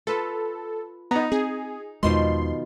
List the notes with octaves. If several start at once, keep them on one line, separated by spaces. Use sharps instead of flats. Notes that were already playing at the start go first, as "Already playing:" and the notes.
F4 A4 B4
B3 D#4 A#5
C4 G#4
E2 B2 D#3 F3 G#3 C6